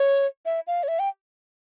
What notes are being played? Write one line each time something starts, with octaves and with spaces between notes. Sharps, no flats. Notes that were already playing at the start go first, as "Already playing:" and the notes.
Already playing: C#5
E5
F5
C#5
E5
G5